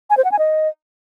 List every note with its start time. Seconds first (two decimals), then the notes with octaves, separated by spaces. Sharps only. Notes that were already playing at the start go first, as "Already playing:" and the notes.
0.10 G#5
0.17 C5
0.24 F#5
0.32 G#5
0.39 D#5